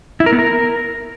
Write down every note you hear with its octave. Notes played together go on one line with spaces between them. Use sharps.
E4
A#4
B3
A#4